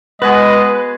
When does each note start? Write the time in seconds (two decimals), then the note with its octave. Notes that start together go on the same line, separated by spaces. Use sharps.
0.22 G#3 B3 F#4 G#4 B4 D#5